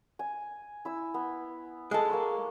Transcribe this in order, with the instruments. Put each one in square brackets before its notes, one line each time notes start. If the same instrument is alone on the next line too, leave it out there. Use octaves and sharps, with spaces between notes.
[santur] G#5
E4 E6
B3
[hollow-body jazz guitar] G#3 A4
[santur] A#3 C#6 E6